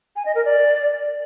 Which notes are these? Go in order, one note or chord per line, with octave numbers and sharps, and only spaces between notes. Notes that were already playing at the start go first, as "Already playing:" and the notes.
G#5
D#5
A#4
D5